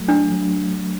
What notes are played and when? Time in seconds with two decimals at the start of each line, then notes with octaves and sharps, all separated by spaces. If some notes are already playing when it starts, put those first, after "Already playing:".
Already playing: F#3 A3
0.08 D4
0.32 F#3